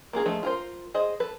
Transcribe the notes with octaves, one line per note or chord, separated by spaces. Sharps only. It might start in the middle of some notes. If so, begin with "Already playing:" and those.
A#3 F4 G#4 A#4
F3 G#3 A3
F4 A#4 C5
G#4 C5 D#5
A4 B4